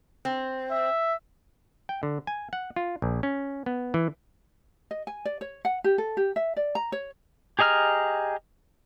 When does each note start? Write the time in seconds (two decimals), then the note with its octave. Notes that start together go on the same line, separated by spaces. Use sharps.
0.25 C4
0.71 E5
1.89 G5
2.03 D3
2.27 G#5
2.53 F#5
2.76 F4
3.02 A#1
3.23 C#4
3.66 B3
3.94 E3
4.91 D#5
5.07 G#5
5.25 D5
5.41 C#5
5.65 F#5
5.84 G4
5.98 A4
6.17 G4
6.36 E5
6.57 D5
6.75 A#5
6.92 C#5
7.59 G4 G#4 D#5 A#5 F6